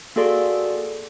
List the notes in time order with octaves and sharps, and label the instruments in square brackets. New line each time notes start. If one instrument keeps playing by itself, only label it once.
[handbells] A#3 F#4 G#4 A4 D5 C6